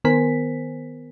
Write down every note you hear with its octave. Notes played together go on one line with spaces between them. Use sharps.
D#3 B3 A#4 C5 G#5 B6